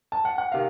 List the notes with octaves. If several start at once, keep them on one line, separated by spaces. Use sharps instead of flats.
A5
F#5
F#5
C3 D#3 F5